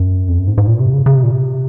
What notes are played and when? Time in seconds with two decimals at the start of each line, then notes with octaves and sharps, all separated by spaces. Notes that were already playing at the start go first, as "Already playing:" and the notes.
Already playing: F#2
0.28 F2
0.38 F#2
0.48 G#2
0.58 G#2
0.67 A#2
0.80 C3
0.93 C#3
1.06 C#3
1.15 C3
1.23 A#2
1.31 C3